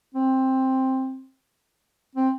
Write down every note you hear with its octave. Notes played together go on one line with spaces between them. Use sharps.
C4
C4